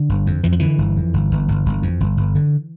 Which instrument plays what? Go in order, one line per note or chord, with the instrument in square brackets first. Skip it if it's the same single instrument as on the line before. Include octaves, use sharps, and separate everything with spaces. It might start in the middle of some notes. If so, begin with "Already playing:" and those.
Already playing: [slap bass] D3
G1
F2
F2 E3
F3
D3 E3
G1
F2
G1
G1
G1
G1
F2
G1
G1
D3